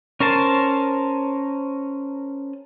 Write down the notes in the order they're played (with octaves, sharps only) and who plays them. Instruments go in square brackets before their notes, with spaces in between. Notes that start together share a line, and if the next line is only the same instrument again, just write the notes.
[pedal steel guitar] C#4 A#4 C5 A5